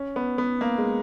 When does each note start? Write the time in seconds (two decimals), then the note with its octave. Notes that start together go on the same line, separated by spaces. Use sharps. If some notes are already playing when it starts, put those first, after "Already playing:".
Already playing: C#4
0.16 B3
0.38 B3
0.61 A#3
0.78 G#3